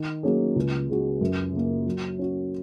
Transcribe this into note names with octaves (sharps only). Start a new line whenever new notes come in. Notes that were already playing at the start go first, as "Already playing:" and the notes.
Already playing: D#3
F#3 A#3 C#4 G#4
C#2
C#3 G#3 F#4
F#2
C#3 A#3
F#3
C#4 F#4